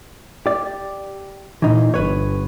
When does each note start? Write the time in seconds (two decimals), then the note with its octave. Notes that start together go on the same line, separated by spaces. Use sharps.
0.46 G4 D5
1.62 A#2 E3 D#4
1.94 G1 B4 C#5